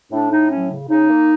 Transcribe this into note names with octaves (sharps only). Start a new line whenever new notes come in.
A2 D4
A2 D#4
F#3 C#4
C#3
C#3 D#4
A#3